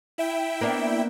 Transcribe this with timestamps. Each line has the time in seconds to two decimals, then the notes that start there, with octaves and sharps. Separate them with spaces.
0.18 E4 E5 G5
0.61 A#3 B3 D4